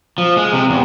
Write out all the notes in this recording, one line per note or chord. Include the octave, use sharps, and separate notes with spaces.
F3
G#3
C3
E2